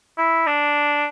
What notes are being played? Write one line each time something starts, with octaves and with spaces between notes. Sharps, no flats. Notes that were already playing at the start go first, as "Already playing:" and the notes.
E4
D4